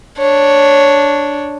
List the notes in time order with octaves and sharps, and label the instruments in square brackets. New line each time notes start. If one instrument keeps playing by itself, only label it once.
[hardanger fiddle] D4 C#5